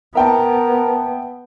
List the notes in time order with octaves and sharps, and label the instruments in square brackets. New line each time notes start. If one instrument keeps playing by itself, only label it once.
[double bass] B3 [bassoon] A#4 [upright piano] E5 G5 A5